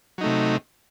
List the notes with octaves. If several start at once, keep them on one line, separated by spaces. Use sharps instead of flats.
C3 F#3 A3 D#4